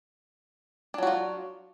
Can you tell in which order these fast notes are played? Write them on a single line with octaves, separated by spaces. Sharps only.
D4 F#3 F#4 F4